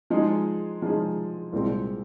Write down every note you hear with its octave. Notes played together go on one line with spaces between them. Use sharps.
F3 G#3 D#4 G#4
F3 G#3 D#4 G#4
C2 A#2 G#3 C4